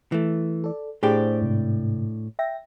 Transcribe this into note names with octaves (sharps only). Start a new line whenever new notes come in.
E3 A3
A4 D5
A2 D4 G4 G#4 C5
G#2 C3
E5 G5 A#6